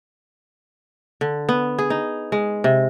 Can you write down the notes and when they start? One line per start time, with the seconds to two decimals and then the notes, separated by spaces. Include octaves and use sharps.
1.21 D3
1.49 B3
1.79 G#4
1.90 D#4
2.32 G#3
2.64 C3